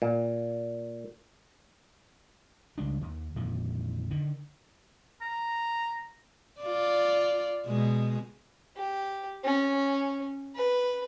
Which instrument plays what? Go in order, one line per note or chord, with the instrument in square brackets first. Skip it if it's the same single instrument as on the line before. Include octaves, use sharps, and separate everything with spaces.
[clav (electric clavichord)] A#2
[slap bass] C#2 G3 D4
D#2
F2 A#2 D#3 E3
D3 D#3
[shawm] A#5
[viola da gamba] F4 D5
B2 G#3
[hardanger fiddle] G4
C#4
B4